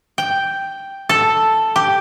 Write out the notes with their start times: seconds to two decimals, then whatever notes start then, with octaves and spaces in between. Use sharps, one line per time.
0.18 G5
1.09 A4
1.76 G4